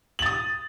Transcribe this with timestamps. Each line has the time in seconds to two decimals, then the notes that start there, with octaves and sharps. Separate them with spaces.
0.19 F#7
0.22 A6
0.26 D#6